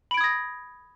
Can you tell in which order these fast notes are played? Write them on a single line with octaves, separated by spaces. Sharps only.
B5 D7 G#6 D#6 A#6